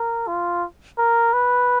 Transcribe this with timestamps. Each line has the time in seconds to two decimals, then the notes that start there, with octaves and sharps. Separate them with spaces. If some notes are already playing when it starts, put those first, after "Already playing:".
Already playing: A#4
0.27 F4
0.98 A#4
1.33 B4